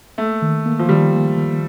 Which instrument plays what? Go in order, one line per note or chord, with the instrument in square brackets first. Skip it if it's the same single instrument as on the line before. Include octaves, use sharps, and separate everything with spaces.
[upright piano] A3 [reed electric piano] A#3
[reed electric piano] D#3
A#3
[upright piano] F3
[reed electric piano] D#3 [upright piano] G3
[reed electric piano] A#3
D#3